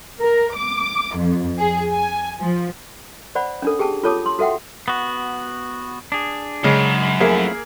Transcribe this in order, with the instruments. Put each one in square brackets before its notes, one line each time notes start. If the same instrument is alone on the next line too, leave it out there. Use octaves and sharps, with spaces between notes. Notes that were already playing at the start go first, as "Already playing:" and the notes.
[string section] A#4
D6
F2
G#4
G#5
F3
[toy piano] C5 D5 F#5 B5
C#4 D4 A4
G4 G#4 G5 A5
F4 A4 C#5 A5 D6 D#6
C6
F#4 A4 E5 F#5 G5
[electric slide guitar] B3 F#4
D4 G#4
[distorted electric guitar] F#2 [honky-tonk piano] C#3 G#3
[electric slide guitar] F3 A3 E4 [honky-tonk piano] A#3 G#4 A#4